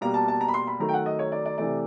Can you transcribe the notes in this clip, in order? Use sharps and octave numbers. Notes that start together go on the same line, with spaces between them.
B2 G3 A#3 A#5
A5
A5
A#5
B5
C6
B5
D#3 F#3 A3 A#5
G5
F#5
D#5
C#5
D5
D5
C3 E3 A3 D5